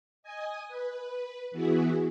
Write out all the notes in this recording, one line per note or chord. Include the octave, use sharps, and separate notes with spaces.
D#5 G#5 D#6
B4
E3 B3 E4 F#4 G#4